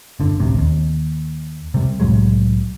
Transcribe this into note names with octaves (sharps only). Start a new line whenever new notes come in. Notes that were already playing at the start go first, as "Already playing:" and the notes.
G1 D3
A1 D2 C3
D#2
C3 G3
C2 A2 F#3 G#3